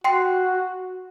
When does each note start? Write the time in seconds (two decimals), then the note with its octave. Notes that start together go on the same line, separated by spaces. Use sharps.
0.04 F#4 G5 C6 C7